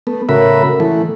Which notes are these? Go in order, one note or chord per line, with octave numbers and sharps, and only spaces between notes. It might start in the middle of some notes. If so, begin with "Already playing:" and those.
A3 B3
A2 C#3 F#4 A#4 E5 B5
E3 A3